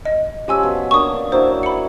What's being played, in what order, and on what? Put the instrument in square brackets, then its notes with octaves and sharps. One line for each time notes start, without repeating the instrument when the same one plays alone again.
[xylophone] D#5
[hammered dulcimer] F3 C#4 B4 [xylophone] G4 G#5 E6
[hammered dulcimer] B2
[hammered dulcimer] A#3 D4 [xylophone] C#6 D#6
[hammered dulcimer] F#3 D4 E4 [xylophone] C5
[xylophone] B5 C#7